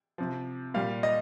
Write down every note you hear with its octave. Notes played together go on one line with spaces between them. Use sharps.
C3 F3
A#2 G3 F5
D#5